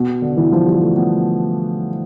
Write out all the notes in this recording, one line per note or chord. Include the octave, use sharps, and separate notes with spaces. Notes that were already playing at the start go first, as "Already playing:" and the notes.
Already playing: B2
D3
E3
F3
G3
A3
B3